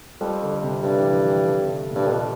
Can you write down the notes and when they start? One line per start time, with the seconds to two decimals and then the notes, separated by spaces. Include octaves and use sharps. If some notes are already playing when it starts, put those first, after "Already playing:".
0.21 F2 G3
0.42 D3
0.62 C3
0.82 G2 D3
0.98 E3
1.14 F3
1.29 E3
1.45 D3
1.60 C3
1.76 C3
1.91 G2 A#2
2.06 F2 C3